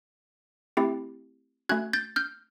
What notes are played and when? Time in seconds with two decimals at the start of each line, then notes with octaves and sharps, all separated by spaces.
0.77 A3 C4 E4 G4
1.69 A3 C#4 F#4 F#6 G#6
1.93 G6 A6
2.16 F6 G6